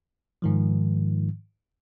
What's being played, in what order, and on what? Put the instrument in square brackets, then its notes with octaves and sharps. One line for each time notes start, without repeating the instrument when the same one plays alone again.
[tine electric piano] G#2 D#3 F3